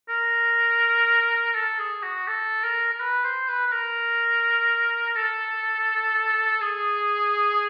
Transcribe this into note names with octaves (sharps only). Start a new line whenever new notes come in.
A#4
A4
G#4
F#4
A4
A#4
A#4
B4
C5
B4
B4
A#4
A4
G#4